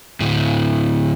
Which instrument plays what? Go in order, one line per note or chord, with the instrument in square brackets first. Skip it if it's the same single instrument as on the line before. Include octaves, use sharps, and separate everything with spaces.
[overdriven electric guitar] D2 A2